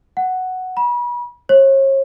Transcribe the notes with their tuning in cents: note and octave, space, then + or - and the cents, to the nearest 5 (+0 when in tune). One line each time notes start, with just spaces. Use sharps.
F#5 +5
B5 -35
C#5 -40